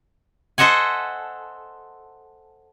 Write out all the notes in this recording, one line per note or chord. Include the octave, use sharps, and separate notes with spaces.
A4 C5 D#5 E5 F#5 G#5